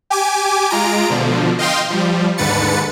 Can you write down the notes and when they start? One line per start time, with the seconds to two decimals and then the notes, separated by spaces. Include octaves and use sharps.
0.10 G4 G#5 D6
0.70 G#3 F4 A#5 D7
1.10 B2 D3 F3
1.59 D#5 F5 G5 C6
1.90 F3 G3
2.38 D#2 G#2 D3 B4 A6 C#7